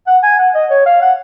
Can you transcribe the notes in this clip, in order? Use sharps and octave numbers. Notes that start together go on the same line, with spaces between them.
F#5
G#5
F#5
D#5
C#5
F5
F#5